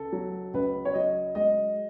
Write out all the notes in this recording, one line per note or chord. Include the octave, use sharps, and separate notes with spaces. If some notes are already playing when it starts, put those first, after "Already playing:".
Already playing: C#2 A4
F#3
C#2 B4
C#5
F#3 D#5
G#3 D#5